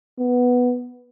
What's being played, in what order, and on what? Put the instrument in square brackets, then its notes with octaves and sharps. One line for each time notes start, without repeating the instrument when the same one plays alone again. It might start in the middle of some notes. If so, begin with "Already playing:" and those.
[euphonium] B3